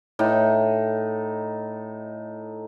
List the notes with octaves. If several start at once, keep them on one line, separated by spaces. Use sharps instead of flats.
A2 D#4